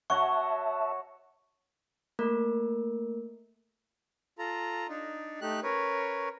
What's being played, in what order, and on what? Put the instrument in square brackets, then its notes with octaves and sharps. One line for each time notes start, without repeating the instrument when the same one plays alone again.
[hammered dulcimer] F#4 C#5 F#5 [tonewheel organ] E5 A5 [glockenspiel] C#6
[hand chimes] A3 A#3 A#4
[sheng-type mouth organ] F4 A4 A#5
D4 D#4
A3 D#4 G4 F#6
C#4 A#4 B4 C#5